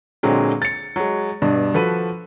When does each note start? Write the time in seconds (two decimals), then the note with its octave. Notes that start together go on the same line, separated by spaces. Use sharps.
0.23 A#2 D3 F#3 G#3 C4
0.62 A6 C#7
0.96 F#3 G#3
1.42 G2 B2 D4
1.74 F3 F#4 A4 B4 B5 D#7